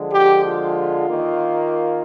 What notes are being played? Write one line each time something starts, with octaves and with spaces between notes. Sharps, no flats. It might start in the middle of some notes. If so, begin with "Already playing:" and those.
Already playing: D3 F3 G#3
G4
F4
D#3 A#3